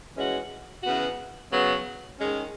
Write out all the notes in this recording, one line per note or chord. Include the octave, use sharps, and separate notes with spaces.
E3 G#3 C#4 F#4
C#3 E3 B3 F#4
C#3 F#3 B3
D#3 G#3 C#4